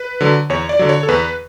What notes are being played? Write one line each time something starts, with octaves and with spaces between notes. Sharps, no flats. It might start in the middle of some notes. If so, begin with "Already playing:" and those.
Already playing: B4
D3 F#3
E2 C#5
D5
D3 F#3
C#5
A4
E2 B4